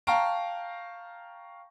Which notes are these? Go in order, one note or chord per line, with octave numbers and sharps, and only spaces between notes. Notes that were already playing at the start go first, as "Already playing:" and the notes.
F5 G5 A5 A#5 C#6 D7